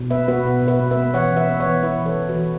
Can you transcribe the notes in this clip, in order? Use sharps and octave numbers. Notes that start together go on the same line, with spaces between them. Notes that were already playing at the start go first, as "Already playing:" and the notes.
Already playing: B2
B3 B4 E5
B3 F#4 B4
B2
B2
B4 E5
B2
B4 E5
B3
E3 C#5 F#5
E3
B4 E5
B3
C#5 F#5
E3
E4 B4 E5
E3
A4 C#5
E3
F#4 B4
E3